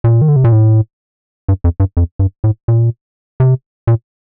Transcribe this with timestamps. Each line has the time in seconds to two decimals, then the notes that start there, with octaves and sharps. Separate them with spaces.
0.04 A#2
0.22 D#3
0.28 D3
0.36 C3
0.44 A#2
0.52 A2
1.49 G2
1.64 F2
1.80 G2
1.97 F2
2.19 G2
2.44 A2
2.68 A#2
3.40 C3
3.87 A#2